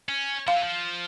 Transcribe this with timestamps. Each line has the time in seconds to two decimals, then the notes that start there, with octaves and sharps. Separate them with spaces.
0.09 C#4
0.48 F3 F5
0.56 E3
0.64 F3